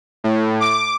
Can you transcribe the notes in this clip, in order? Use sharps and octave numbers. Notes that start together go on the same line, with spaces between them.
A2
D6